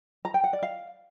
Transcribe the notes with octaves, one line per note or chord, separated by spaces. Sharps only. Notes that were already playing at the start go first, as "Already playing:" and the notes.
A#5
G5
F#5
D5
F5